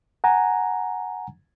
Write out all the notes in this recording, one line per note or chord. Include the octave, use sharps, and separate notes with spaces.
F#5 G#5 A#5